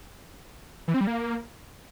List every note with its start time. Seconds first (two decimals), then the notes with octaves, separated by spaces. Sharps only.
0.88 E3
0.94 C4
1.01 G3
1.07 A#3